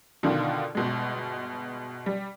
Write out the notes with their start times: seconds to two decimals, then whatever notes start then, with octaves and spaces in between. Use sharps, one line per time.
0.23 B2 D3 D#3 D4 F4
0.75 G1 B2 G#3
2.06 G3